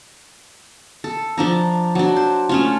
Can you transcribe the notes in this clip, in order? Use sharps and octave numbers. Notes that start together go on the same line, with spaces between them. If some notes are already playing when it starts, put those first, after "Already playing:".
A4
F3 D4 A#5
F#3 D4
C5
A3 C#4 F4